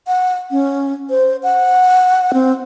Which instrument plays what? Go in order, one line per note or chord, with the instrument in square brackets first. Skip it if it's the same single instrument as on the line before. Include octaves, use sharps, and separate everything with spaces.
[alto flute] F#5
C#4
C5
F#5
C4